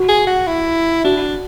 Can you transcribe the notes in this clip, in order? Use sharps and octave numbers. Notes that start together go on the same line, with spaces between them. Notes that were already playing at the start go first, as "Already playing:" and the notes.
Already playing: F#4
G#4
F#4
E4
D4 F#4